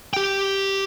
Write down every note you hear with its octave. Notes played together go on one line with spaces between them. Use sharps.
G4 G5